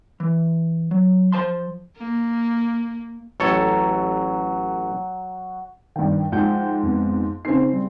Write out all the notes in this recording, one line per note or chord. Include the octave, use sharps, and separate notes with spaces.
E3
F#3
F3 C5 A5 C6
A#3
A1 F#3 A4 C#5
G2 D#3 D4 G5
G#2 F3 F#5 G5 G6
F2 B3
C#3 C4 D#4 C5 C7
G3